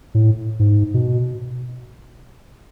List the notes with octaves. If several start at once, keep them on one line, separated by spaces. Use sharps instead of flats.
A2
G#2
B2